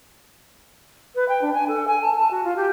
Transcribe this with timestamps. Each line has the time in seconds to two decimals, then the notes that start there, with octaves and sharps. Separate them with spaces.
1.15 B4
1.28 G5
1.41 D4
1.54 G#5
1.68 A4
1.87 G#5
2.02 A5
2.16 A5
2.31 F#4
2.44 F4
2.56 G4